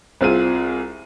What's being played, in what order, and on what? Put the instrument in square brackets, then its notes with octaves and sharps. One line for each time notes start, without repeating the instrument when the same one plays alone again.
[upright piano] C2 C4 F4 G#4 D#7